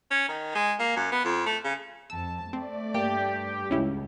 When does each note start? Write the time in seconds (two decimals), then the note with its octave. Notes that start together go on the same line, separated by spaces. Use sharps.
0.11 C#4
0.29 D#3
0.55 G#3
0.79 A#3
0.96 F#2
1.12 B3
1.25 F2
1.46 A3
1.64 C#3
2.10 F2 A5 E6
2.53 A3 C4 D5
2.94 G2 A#3 G4 D7
3.71 C#2 C#4 E4 G4